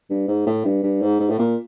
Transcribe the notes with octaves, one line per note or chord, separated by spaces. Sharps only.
G2
G#2
A2
G2
G2
G#2
G#2
A2
A#2